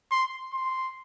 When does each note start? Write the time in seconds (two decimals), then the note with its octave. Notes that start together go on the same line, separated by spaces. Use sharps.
0.11 C6
0.54 C6